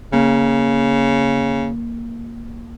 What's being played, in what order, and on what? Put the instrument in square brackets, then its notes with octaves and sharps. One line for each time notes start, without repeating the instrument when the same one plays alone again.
[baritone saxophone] C#3 [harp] A#3